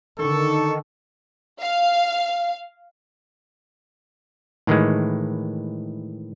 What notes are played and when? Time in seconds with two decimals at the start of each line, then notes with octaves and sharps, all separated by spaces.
0.19 D3 D#3 A4 C#6
1.60 F5
4.67 A2 D#3 E3 G#3